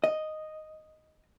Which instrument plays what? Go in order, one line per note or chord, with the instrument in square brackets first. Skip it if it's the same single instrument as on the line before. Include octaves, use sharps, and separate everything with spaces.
[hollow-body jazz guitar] D#5